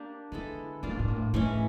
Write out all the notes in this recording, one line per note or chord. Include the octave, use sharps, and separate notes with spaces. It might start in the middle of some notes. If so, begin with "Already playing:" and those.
Already playing: A#3 D4 G4
D3 G#3 B3 E4 A4
A2 A#3 D4 F4
A#2
A2
A#2
A2
A2 E3 G#3 C#4